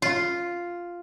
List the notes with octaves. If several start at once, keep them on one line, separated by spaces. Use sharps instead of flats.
F4